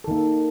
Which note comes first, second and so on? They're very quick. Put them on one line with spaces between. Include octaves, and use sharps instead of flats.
A4 D#3 A#3